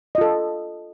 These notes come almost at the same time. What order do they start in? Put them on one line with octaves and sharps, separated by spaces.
D#5 F4 A4